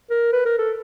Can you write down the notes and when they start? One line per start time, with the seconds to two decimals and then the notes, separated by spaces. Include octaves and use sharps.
0.10 A#4
0.32 B4
0.46 A#4
0.58 A4